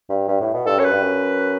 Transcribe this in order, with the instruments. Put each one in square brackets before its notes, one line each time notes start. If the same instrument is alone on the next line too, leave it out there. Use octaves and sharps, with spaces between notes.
[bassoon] G2
G2
A2
B2
[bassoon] G2 [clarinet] A4
[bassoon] F#2 [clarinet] C#5
[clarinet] B4
[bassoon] G2
F#2